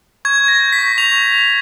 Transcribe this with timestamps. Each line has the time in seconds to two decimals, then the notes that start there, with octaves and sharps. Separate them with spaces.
0.25 C#6 G#6
0.43 C#6 A#6
0.61 G6
0.72 B6
0.79 C#6
0.97 C#6 F7